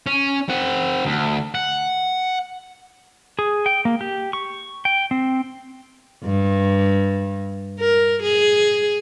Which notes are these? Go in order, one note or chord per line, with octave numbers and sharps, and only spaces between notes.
C#4
C4 F#5
D2
F#5
G#4
G5
A#3
G4
C#6
G5
C4
G2
A#4
G#4